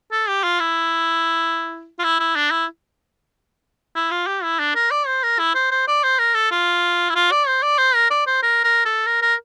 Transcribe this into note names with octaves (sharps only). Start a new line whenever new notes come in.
A4
G4
F4
E4
F4
E4
E4
D4
E4
E4
F4
G4
E4
D4
A#4
D5
C5
A#4
E4
C5
C5
D5
C5
A#4
A4
F4
E4
F4
D5
C5
D5
C5
A#4
D5
C5
A#4
A#4
A4
A#4
A#4